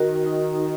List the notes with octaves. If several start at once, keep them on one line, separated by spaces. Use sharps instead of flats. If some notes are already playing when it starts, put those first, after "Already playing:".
Already playing: D#3 F#4 A#4
D#4